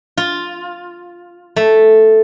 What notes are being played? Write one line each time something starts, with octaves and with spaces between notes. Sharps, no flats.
F4
A3